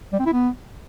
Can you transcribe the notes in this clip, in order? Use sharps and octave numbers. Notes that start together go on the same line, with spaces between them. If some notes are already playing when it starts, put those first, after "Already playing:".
G3
C4
E4
B3